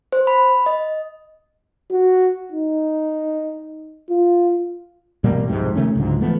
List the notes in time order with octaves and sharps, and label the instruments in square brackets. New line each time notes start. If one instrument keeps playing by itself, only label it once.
[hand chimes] C5
B5
D#5
[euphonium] F#4
D#4
F4
[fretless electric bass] A1 B2 G3 A#3
C2 F2 G#2 C3
C3 D#3 A3 C#4
C#2 G#2 D3 F#3
E3 F3 A3 B3